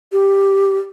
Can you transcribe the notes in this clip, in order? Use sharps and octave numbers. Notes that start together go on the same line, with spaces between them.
G4